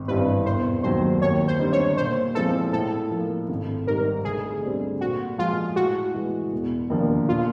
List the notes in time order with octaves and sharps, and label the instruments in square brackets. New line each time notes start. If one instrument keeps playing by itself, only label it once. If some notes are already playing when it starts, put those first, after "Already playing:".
Already playing: [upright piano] G#1
[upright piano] G2 E3 G3 C4 [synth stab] B4
[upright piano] E1 [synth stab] C5
[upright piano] D#2 D#3 F#3 [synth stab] C5
[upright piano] D#2 [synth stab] C#5
[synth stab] C5
[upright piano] D3 G3 C4 D#4
[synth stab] C#5
[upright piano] A#2 [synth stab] C5
[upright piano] F3 G#3 C4 E4 [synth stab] A4
[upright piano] A2 [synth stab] A4
[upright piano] F3 A#3
G#1
[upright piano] G#2 D#3 G3 [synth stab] A#4
[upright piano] D2 [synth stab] G#4
[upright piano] D3 G3 C4
[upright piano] A#2 [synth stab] F#4
[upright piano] F3 G#3 [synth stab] F4
[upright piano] A2 [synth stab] F#4
[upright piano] E3 G#3
E1
D#2 D3 F3 A#3
[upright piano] A#2 [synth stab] F4